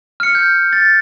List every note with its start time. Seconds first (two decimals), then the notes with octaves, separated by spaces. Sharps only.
0.20 F6 C#7
0.35 G6
0.73 A6